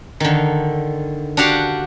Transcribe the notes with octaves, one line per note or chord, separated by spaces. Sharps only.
D3 D#3
D4 F#4 G4 F5 F#5